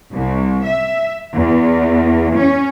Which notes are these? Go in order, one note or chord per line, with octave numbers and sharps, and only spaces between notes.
C2
E5
E2
C#4